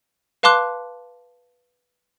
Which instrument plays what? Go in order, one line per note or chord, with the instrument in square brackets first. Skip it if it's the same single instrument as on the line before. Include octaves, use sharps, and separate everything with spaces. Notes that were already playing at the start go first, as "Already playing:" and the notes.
[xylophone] B4 F5 A5 C6 D6 F#6